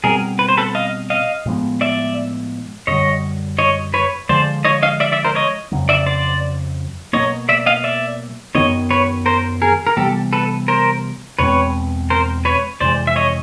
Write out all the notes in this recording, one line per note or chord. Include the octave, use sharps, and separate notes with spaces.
B2 G3 C4 G#4 A#4
B4
C5
A4 B4
D#5 F5
D#5 F5
A2 F3 G#3 B3
D5 E5
F#2 D3 G3 C#5 D#5
C#5 D#5
B4 C#5
D3 F3 G#3 C5 D5
C#5 D#5
D#5 F5
D5 E5
D5 E5
A#4 C5
C#5 D#5
F2 C#3 F#3
D5 E5
C5 D5
B2 F#3 A#3 C#5 D#5
D5 E5
D#5 F5
D5 E5
F#2 D#3 F#3 B3 C#5 D#5
B4 C#5
A#4 C5
G#4 A#4
A#4
C3 E3 G3 B3 G4 A4
A4 B4
A#4 C5
E2 B2 G#3 C4 B4 C#5
A#4 C5
B4 C#5
F2 C3 E3 G#3 C5 D5
E5
C#5 D#5